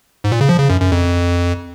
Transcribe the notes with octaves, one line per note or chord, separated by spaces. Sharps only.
G#2
A#2
C#3
F3
C#3
F#2
F#2
F2